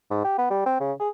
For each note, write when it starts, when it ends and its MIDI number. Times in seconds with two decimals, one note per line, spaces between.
0.10 0.22 44
0.24 0.34 67
0.38 0.49 59
0.50 0.63 55
0.66 0.76 60
0.80 0.93 49
1.00 1.09 68